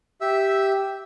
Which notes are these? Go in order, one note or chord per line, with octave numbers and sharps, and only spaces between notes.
G4 E5 E6